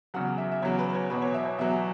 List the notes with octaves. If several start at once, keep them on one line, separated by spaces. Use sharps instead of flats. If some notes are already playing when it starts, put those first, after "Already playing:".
E2 C#3 F#3 F#5
E5
E5
E2 C#3 F#3 C#5
B4
C#5
E2 B2 F#3 B4
C#5
E5
C#5
E2 B2 F#3 E5